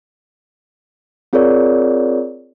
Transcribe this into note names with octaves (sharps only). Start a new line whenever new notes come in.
C4 F4 G#4 A#4 C#5 D5